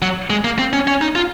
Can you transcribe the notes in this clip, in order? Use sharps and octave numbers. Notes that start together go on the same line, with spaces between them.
F#3
G#3
A#3
C4
C#4
C#4
D#4
F4